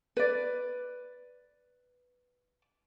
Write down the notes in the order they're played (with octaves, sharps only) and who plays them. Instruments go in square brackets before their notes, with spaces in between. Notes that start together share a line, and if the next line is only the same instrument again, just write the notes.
[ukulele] B4 D5